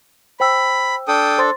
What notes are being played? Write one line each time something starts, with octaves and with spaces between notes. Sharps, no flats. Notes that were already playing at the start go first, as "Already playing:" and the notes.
C5 G5 B5 E6
D4 A4 G5 D#6
C5 C6 A6